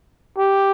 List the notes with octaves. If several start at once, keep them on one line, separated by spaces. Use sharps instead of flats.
G4